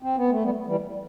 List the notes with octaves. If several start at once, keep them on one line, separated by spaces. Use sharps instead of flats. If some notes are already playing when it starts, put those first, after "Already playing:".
C4
B3
A3
G3 B3
E3 G3